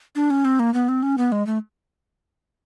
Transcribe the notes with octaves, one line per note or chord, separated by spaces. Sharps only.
D4
C#4
C4
A#3
B3
C4
C#4
B3
G#3
A3